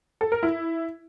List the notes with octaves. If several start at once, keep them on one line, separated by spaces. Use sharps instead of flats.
A4
A#4
E4